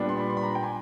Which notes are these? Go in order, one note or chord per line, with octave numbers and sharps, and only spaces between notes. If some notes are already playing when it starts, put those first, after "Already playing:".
Already playing: A#2 G3 B3 D4
C6
B5
C6
B5
A#5
G5
G#5